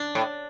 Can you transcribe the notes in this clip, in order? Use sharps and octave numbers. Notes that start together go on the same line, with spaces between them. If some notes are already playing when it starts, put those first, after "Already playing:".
Already playing: D4
A2